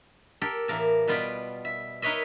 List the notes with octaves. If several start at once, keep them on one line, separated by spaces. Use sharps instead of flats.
G4 A4 A#4
A2 E3 A#3 A#4 A5
B2 G3 B3 F4 B4
E5
D#4 A#4 B4 C#5 D#5 E5